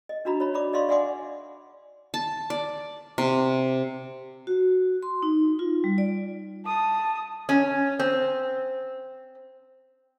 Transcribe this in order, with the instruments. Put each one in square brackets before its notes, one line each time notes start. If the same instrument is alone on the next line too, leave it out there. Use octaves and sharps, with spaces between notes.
[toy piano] D#5
D4 D#4 F#4 A#5 B5
C#5 B5
D5 B5 D6
D5 D#5 F5 C6 C#6
D5 E5 F#5 G#5 C6 D6
[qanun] A5
D5
C3
[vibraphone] F#4
C6
D#4
F4
G3
D5
[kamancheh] A5 D#6
[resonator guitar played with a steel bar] C#4
C4